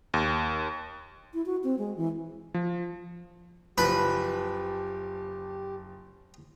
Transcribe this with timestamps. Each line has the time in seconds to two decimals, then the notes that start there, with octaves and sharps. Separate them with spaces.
0.14 D#2
1.33 E4
1.46 F#4
1.64 C4
1.78 G#3
1.97 E3
2.54 F3
3.78 F#1 F3 G4 B4 B6